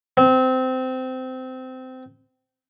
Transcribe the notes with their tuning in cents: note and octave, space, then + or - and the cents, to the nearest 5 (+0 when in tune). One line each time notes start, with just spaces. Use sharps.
C4 -20